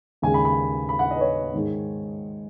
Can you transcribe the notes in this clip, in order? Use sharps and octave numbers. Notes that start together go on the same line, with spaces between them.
D#2 C#3 G#3 G#5
B5
B5
B5
F#5
D#5
B4
C#5
G#2 D#3 G#3